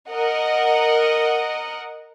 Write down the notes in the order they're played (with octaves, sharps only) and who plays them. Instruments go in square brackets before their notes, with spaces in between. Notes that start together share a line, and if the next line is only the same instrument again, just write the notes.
[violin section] A#4 D#5 F#5